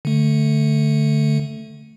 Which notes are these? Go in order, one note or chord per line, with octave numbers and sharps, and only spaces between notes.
D3 A3